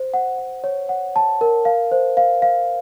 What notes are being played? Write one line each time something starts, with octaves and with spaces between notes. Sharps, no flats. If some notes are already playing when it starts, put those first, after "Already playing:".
Already playing: C5
F#5
F#5
C#5
F#5
A5
A#4
F5
C5
F5
F5